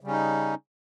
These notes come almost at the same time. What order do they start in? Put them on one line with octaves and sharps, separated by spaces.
C#3 G3 C#4 D#4